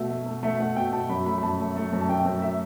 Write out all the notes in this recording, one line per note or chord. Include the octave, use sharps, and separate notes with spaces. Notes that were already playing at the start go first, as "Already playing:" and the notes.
Already playing: B2 A3 E5
A3
A3
A3 E5
A3 F#5
B2 G5
B2 A5
F#2 B5
A3 B5
B5
F#2 A5
A3
A3
F#2
A5
F#2 G5
G5
F#2
A3 E5